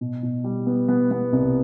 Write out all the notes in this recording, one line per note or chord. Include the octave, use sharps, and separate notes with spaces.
B2
B2
G3
B3
B3
B3
C2